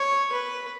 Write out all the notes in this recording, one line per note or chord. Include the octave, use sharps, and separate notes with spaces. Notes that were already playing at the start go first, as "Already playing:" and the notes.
Already playing: C#5
B4